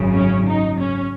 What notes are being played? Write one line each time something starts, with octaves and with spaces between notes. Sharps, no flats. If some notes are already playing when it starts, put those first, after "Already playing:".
Already playing: G#1 F#2 C#3
C#4
D#4
C#4